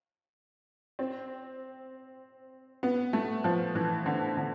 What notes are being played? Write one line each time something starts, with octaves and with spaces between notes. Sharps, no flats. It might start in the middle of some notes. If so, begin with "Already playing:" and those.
C4
B3
A3
F3
E3
D3
D3